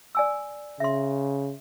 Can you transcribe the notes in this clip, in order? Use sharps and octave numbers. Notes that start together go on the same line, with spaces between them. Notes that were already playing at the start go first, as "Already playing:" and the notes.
D5 G#5 E6
C#3 E5 C6